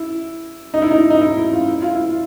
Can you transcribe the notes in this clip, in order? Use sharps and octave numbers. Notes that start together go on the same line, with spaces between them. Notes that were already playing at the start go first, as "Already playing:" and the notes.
Already playing: E4
D#4
E4
D#4
D#4
E4
E4
F4
E4
F4
E4